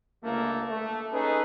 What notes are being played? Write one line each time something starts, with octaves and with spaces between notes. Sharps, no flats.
G1 C#2 A3 A#3
A3
C#4 D#4 G#4 A4 B4